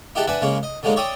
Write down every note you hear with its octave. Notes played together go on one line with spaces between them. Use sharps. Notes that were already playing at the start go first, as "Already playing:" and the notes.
D#4 E4 G4 G#4 F#5 A5
D4 B4 E5 F#5 G#5
C#3 G#3 A#3 C#4
D#5
D3 F#3 G#3 A#3 D#4
C#5 D5 E5 G5 D#6